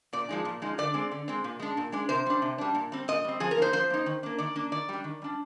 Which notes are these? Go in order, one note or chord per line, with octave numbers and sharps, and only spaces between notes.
A#2 D5
F3 G#3 D#4
A#2
F3 G#3 D#4
D3 D5
G#3 C4
D3
G#3 C4
A#2
G#3 D4
A#2
G#3 D4
C3 C5
G3 D4
C3
G3 D4
A#2
G3 C4
A#2 D#5
G3 C4
F3 G#4
A#4
A#3 D#4 C5
F3 C5
A#3 D#4
D#3
A#3 D4
D#3 D5
A#3 D4
D#3 D5
G3 D4
D#3
G3 D4